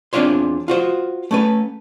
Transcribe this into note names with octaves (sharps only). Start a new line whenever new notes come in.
E2 C4 D4 F4 C#5 C6
F4 F#4 C5
A3 C#4 B4